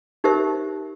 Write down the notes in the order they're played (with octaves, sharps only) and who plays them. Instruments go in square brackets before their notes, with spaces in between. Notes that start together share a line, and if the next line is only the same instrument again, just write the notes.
[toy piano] D#4 G4 A#4 C5 E5